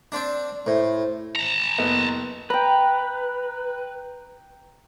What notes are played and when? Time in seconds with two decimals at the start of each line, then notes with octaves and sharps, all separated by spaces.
0.12 C4 D4 D5
0.67 A2 C5
1.35 A5 A#5
1.78 F#1 B3
2.50 B4 G5 A#5